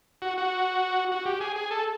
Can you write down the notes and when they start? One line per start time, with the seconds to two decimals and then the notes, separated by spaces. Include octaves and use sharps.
0.22 F#4
0.38 F#4
1.12 F#4
1.26 G4
1.40 G#4
1.56 G#4
1.71 A4